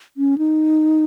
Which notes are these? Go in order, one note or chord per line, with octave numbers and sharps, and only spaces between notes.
C#4
D#4